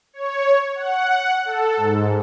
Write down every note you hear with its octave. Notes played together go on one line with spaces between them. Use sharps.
C#5
F#5
A4
G#2